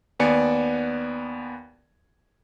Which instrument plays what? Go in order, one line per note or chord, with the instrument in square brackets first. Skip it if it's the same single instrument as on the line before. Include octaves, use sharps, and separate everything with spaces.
[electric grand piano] D#2 B3 D5 G#5 C#7